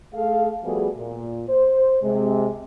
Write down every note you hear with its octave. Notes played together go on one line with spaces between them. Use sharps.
A3 G#4 A4 F5
F3 G3 A3 B3 F#4 G#4
A#2
C5
C3 G#3